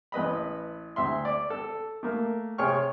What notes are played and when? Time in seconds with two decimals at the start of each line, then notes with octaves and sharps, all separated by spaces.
0.12 A1 B4 D#5 B5
0.96 D2 E5 C6
1.25 D5
1.50 A4
2.03 A3 A#3
2.58 C3 G#4 C#5 G5 C#6 F6